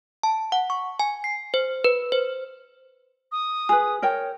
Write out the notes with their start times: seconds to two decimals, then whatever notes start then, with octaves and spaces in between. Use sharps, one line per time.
0.23 A5
0.52 F#5
0.70 C#6
0.99 G#5
1.24 C7
1.54 C5
1.84 B4
2.12 C5
3.32 D#6
3.69 G#4 B4 G#5
4.02 A#4 C#5 G5